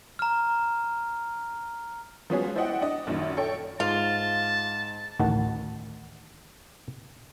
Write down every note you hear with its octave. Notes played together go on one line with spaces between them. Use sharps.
A#5 F6
F3 G#3 B3 C#4 F#4 G#4
E4 C5 D5 D#5 F#5 G5
D4 D#5
A#1 F#2 D#3
A4 C#5 G5
G#2 F4 A5
A1 D2 D#3 F#4 F#5 A5